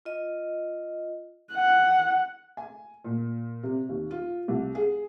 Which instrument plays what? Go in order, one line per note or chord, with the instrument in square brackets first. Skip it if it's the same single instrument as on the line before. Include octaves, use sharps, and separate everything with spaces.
[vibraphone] F4 D#5
[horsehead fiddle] F#5
[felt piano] G#5
A#2
C3
D#2
F4
C2
G#4